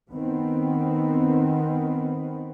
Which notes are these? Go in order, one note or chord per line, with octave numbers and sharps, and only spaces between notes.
D#3 B3 C4